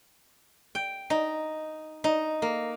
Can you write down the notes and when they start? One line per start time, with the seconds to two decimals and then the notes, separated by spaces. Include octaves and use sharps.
0.75 G5
1.10 D#4
2.04 D#4
2.42 A#3